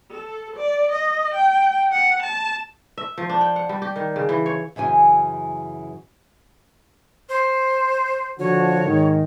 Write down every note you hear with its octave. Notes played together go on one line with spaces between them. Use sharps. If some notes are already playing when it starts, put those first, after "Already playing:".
A4
D5
D#5
G5
F#5
A5
E5
F3
D4
G5
F#5
G3
G4
D#3
C#3
E3
C#5
F#2 C#3 E3 G#5
C5
D3 F3 F#4 C#5
G#2 D#3